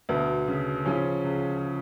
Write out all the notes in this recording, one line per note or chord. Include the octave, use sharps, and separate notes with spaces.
D2 B2 B3
C#3
C#3 F3 C#4
C#2